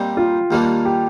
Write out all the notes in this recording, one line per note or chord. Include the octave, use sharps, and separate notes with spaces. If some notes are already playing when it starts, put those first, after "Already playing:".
Already playing: A#2 G3 C4 D#4 G4
F4
D#2 D#3 G3 A#3 D4
G4